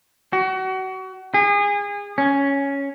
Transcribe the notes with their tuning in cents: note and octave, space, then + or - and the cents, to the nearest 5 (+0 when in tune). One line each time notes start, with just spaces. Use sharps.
F#4 +30
G#4 -30
C#4 +5